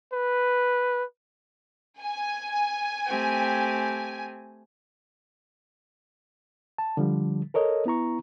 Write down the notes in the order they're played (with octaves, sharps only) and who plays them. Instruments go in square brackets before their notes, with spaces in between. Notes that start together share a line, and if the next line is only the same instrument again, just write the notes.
[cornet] B4
[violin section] G#5
[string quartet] A3 C4 G4
[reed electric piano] A5
D3 F3 G3
A4 A#4 C#5 D#5
B3 E4 A#5 C#6